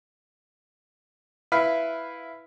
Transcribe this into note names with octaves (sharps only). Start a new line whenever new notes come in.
E4 B4 E5 F5